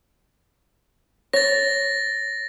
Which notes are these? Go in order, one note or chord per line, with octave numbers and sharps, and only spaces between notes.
C#5 A6 A#6